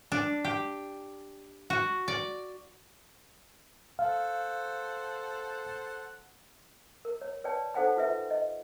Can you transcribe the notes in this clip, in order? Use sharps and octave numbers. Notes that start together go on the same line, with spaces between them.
D4
G4
F#4
D5
A4 C5 F5 F#5
A#4
C#5
B4 C#5 D5 G5 A5
D#4 A4 C5 F#5 G5 B5
F4 B4 E5
D#5